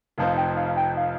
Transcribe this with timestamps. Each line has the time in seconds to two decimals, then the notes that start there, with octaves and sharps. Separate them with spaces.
0.18 F1 F2 F3 D#4 C5 F5
0.37 G5
0.56 F5
0.77 G5
0.97 F5